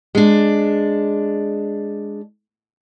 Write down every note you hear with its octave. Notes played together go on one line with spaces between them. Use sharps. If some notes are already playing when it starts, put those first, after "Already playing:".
G#3 D4